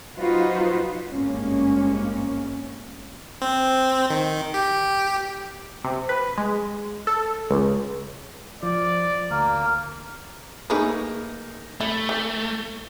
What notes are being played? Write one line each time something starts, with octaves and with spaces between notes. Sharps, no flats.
F#3 D#4 F4 F#4 B4 C5
G#1 G2 G#3 A#3 C#4
C4
D#3
G4
C3
B4
G#3
A4
C#2
F3 D5
D2 A#3 A#4
A3 A#3 D#4 G#4 B4
A3 E4
E3